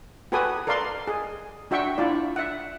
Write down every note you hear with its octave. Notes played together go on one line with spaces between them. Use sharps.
F#4 G4 A4 B4 G#5 D#6
A4 A#4 D5 F5 C6
G#4
D4 F#4 E5 G5 C#6
D4 E4 F4 D5
E5 F#5